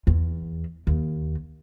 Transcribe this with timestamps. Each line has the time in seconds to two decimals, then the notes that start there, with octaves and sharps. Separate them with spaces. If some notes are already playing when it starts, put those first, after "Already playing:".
0.07 E2
0.87 D#2